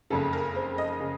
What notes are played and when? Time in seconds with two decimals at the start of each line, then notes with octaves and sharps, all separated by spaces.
0.10 F#1 F2 C#3 A4
0.33 A#4
0.55 C5
0.78 D#5
1.00 C#3